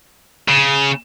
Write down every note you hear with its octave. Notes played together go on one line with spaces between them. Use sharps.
C#3